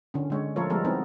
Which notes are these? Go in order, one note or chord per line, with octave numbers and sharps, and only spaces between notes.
D3 C#4
D3 G#3 C#5
F3 A3 F4 A4 A#4 C#5
F3 G3 G#3 B3 A4 A#4
B3 C4 D#4 E4 G#4 A#4